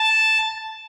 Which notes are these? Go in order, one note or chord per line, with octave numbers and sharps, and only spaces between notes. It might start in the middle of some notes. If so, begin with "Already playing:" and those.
Already playing: A5